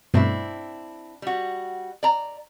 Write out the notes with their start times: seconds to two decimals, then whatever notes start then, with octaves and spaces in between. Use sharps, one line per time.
0.14 G2 B2 A3 C4 D4 E4
1.22 G3 F#4
2.03 D5 A#5